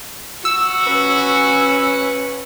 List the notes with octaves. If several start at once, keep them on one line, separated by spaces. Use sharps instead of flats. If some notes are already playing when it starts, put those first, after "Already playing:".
F#4 E6
C#4 B4